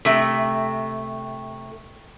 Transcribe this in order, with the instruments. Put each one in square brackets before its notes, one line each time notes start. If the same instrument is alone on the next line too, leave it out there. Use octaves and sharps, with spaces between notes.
[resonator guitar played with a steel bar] C3 A3